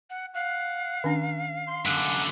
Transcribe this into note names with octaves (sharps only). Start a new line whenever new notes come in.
F#5
F5 F#5
D#3 C#4 D4
C6
F#2 D3 F#5